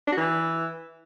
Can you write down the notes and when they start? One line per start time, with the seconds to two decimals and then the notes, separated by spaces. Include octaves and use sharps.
0.07 D4
0.12 F#4
0.17 E3